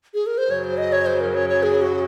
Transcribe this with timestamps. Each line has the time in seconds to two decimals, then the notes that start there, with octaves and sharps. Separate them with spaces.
0.14 G#4
0.26 A#4
0.38 C5
0.50 F#2 C#3 F#3 C#5
0.64 C5
0.78 D#5
0.92 C#5
1.06 C5
1.21 A#4
1.34 C#5
1.49 C#5
1.63 G#4
1.82 F#4